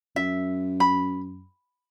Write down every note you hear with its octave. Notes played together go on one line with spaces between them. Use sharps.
F#2 E5
B5